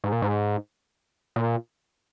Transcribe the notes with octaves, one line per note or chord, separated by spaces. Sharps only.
G#2
A#2
G#2
A#2